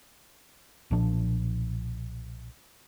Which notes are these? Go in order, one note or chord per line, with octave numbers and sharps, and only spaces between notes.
B1 A#2 F3 D4